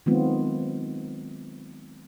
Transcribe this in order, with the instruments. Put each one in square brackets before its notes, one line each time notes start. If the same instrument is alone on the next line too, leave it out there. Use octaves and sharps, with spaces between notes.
[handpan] D#3 F#3 G#3 B3 C4 F4